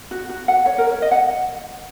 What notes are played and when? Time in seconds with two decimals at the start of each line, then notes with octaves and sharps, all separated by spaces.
0.11 F#4
0.29 F#4
0.48 F#5
0.66 C#5
0.78 A#4
0.90 C#5
1.02 D#5
1.11 F#5